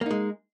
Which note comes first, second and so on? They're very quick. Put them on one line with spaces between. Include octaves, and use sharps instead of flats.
A#3 D#4 G#3